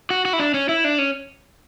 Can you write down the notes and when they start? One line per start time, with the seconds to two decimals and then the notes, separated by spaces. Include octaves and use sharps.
0.10 F#4
0.25 F#4
0.33 E4
0.40 D4
0.54 C#4
0.69 E4
0.84 D4
0.98 C#4